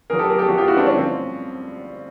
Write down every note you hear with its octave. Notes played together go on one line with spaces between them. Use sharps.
F2 C#3 F#3 G#4 A#4
G4 A4
G#4 A#4
G4 A4
F2 C#3 F#3 F#4 G#4
F4 G4
E4 F#4
C4 D4
G2 D3 F3 C#4
C4